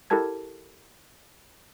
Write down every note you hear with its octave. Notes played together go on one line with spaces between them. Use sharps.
E4 G4 A4 A#4 A5 G#6